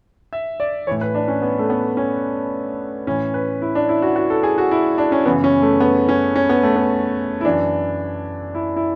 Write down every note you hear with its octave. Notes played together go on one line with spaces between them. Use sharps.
E5
D5
A2 E3 C#5
B4
D4
C#4
B3
A3
B3
C#4
A2 E3 C#4
B4
E4
D4
E4
F#4
F#4
A4
G#4
F#4
E4
D4
C#4
F#2 C#3 E3 B3
C#4
A3
B3
C#4
C#4
B3
A3
B3
E4
F#2 E3 D4
E4
E4